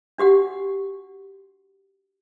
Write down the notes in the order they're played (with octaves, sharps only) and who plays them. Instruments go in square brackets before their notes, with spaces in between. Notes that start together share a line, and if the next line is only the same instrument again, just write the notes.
[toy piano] D4 F#4 G4 F#5